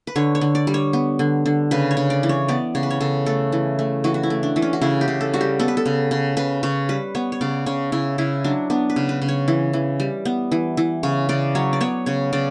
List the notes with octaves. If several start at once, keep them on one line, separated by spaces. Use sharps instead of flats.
B4
D3 C#5
C#5
D3
D5
G3
C#5
B3
D3
D3
C#3 B4
C#5
C#3
D5
E3
C#5
B3 D5
C#3 C#5
B4
C#5
C#3 A4
A3 A4
E3
A3
E3 F#4
F#4
E4
A3
D4
E3
C#4
F#4
C#3 E4
G4
C#3
A4
G3 F#4
G4
B3 A4
B4
A4
C#3
C#3
C#3 B4
C#3 C#5
G3 B4
B3 C#5
C#5
C#3 D5
C#3 C#5
C#3 E4
C#3 E4
F#3 D4
B3 D4
B4
C#3
B4
C#3
C#5
E3
E3
G3
B3
E3
E3
C#3 C#5
C#3 D5
F#3 C#5
D5
B3 C#5
C#3 C#5
C#3 D5